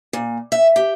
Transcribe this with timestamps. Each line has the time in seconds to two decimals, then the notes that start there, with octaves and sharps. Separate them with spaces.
0.13 A#2
0.52 E5
0.76 G4